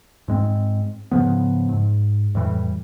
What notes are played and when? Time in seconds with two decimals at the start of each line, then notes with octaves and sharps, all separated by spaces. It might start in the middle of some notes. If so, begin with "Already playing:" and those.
0.28 G#2 G#3 C4
1.11 G#2 C#3 F3 B3
1.69 G#2
2.35 F2 A2 E3 G3